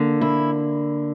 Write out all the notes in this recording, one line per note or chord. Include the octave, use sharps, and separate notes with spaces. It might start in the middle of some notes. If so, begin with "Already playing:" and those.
Already playing: D3 A#3
E4